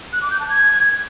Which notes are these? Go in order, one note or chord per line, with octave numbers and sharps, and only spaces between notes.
F#6
D6
G6
A5
G#6